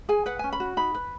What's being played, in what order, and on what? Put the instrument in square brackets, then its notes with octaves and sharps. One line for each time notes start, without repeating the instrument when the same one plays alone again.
[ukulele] G#4 G#5
B4 F#5
C#4 G#5
B5
F#4
D#4 B5
B4